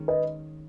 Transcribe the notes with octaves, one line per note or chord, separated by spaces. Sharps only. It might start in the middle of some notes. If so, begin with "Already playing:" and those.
Already playing: D#3 G#3 C#4
B4 D#5